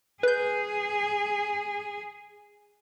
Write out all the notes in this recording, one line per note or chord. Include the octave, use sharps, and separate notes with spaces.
G#4 B4 G6